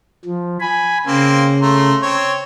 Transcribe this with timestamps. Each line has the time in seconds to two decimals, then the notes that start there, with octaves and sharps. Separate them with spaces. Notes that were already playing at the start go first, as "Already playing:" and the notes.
0.25 F3
0.60 G#5 B5
1.07 C#3 A#3 C4
1.61 A3 A#5 C6
2.02 C4 C#5